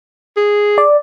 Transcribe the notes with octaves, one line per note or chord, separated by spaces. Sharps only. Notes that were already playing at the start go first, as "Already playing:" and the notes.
G#4
D5